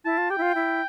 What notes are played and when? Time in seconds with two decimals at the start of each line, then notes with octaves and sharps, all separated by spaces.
0.05 E4 A5
0.18 F4
0.30 G4 G5
0.38 E4
0.42 F4
0.55 E4